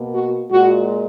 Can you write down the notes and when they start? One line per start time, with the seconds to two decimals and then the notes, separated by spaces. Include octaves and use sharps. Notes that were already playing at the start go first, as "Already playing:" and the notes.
Already playing: B2 A#3
0.14 F#4
0.50 A#2 G#3 F#4